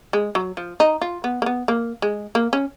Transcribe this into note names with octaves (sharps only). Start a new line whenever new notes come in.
G#3
F#3
F3
D#4
F4
B3
A#3
B3
A#3
G#3
A#3
C#4